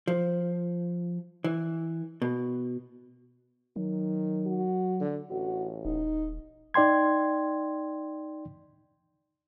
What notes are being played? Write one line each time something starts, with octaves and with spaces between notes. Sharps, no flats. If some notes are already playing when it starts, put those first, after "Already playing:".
F3
E3
B2
D#3 F#3
F#4
D3
A1 F#4
D#1 D#4
D#4 D5 G5 C6 G#6